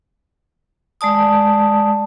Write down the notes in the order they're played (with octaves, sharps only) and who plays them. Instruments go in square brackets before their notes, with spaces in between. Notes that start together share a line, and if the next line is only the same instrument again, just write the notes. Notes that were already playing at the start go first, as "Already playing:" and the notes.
[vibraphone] G#3 D5 A5 D#6